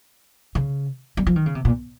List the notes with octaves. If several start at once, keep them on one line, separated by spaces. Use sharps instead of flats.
C#3
G3
F3
D#3
C#3
C3
A#2